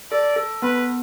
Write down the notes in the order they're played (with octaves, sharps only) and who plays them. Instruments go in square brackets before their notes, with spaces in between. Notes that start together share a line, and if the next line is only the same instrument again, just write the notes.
[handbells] A4 [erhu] D5
[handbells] A4
[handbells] B3 [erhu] B4